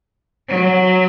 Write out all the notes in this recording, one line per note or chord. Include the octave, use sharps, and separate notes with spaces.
F#3